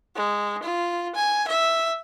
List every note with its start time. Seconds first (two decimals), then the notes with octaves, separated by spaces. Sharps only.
0.15 G#3
0.63 F4
1.15 G#5
1.48 E5